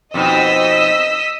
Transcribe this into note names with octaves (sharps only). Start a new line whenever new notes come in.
F2 B2 D#4 D#5 E6 B6